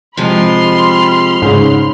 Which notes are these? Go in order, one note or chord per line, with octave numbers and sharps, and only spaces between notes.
C3 F3 G#3 B5 C6 F6
G#2 C#3